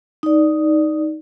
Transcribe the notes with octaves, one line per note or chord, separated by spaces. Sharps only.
D#4 D5